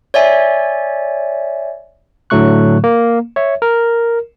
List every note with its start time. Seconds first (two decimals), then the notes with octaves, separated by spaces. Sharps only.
0.14 C#5 D5 E5 G#5
2.30 A2 D3 F#3 A3 C#6 F#6
2.84 A#3
3.36 C#5 E5
3.62 A#4